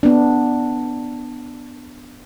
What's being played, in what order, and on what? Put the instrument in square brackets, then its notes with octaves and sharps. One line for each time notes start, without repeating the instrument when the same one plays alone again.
[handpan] B3 D4